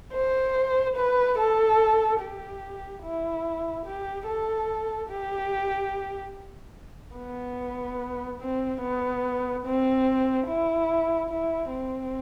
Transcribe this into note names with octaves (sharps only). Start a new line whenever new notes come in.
C5
B4
A4
G4
E4
G4
A4
G4
B3
C4
B3
C4
E4
E4
C4